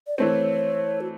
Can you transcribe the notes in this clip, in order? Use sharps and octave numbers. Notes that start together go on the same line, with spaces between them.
D5
E3 A3 C4 C#5
F#4